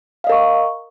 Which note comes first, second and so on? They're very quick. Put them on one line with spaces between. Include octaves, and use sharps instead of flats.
F5 D#5 A#4 C#6